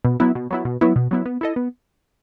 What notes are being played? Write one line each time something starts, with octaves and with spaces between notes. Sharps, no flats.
B2
F#3 B3 E4
B2
F#3 B3 E4
B2
F#3 B3 E4
B2
F#3 B3 E4
B3
E4 A4 D#5
B3